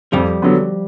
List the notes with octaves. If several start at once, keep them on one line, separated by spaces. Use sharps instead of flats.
F2 F3 G3
D3 F#3 B3